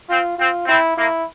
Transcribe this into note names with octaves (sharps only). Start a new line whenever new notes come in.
C4 F4
C4 F4
C4 E4
A#3 E4